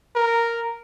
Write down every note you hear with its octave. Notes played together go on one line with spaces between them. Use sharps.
A#4